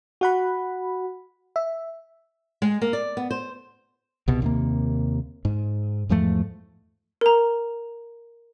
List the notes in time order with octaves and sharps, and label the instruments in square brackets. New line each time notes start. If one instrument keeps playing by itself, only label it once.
[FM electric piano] F#4 F#5 B5
E5
[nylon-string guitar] G#3
A#3
D5
B3
C5
[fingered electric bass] C2 B2
D#2 C3 A#3
G#2
E2 G#2 F3 A3
[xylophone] A#4 A#5